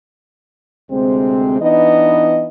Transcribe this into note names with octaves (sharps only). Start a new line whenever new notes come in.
D2 C3 G#3 C4
E3 B3 D4 D#4 D#5